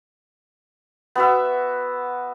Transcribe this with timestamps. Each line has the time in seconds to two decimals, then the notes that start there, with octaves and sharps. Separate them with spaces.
1.15 B3 F#4 E5